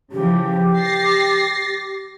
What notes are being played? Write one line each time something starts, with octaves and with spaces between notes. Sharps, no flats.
C#3 E3 F3 G4
A6 A#6 C7